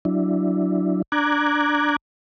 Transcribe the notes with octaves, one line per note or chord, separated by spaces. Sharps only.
F#3 D4 E4
D4 A#5 D6 F#6 G#6